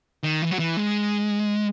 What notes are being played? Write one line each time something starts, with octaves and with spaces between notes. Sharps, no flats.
D#3
E3
F#3
E3
G#3